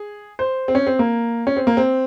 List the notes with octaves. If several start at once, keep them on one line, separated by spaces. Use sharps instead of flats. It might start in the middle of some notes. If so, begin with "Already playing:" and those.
Already playing: G#4
C5
C4
C#4
C4
A#3
C#4
C4
A#3
C4